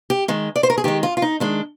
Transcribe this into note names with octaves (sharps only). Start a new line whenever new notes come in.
G4
D#3 G#3
D5
C5
A#4
G#4
D#3 G#3 G4
F4
F4
D#4
D#3 G#3 D4